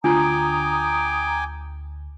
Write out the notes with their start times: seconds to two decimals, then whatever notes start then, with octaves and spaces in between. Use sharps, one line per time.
0.04 D2 D4 F4 G5 G#5 A#5 D6 D#6